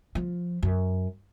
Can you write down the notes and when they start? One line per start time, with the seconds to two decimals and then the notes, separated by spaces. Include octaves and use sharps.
0.15 F3
0.63 F#2